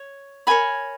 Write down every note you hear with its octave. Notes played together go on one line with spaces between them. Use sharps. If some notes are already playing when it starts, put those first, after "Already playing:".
Already playing: C#5
F#4 A#4 C#5 G#5 B5